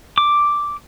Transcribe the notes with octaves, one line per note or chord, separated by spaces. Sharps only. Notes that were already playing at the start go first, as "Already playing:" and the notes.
D6